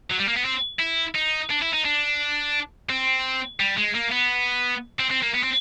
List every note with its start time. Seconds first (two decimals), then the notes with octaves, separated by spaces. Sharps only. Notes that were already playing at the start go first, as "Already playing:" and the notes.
0.10 F#3
0.19 G3
0.28 A#3
0.36 B3
0.45 C4
0.79 E4
1.15 D#4
1.50 D4
1.61 E4
1.73 D#4
1.85 D4
2.90 C4
3.60 G3
3.77 G#3
3.95 A#3
4.12 B3
5.00 C4
5.11 C4
5.23 A#3
5.35 B3
5.44 C4